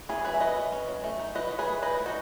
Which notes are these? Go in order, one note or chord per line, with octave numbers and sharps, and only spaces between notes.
C#4 E4 G#4
F#3 G#4 B4
E5
F#3 B4 D#5
C#4
C#4
F#3
A3
D#4
F#3 B4 D#5
F#3
G#4 B4
A3
D#4 B4 D#5
G#3
D#4 F#4